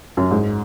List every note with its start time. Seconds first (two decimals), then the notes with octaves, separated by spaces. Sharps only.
0.17 F#2
0.31 G#2